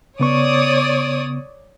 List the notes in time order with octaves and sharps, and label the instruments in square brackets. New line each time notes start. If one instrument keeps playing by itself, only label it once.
[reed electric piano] C#3 B3 C#6 [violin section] C#5 D5 D#6